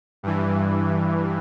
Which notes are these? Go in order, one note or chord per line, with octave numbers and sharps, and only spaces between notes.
G2 E3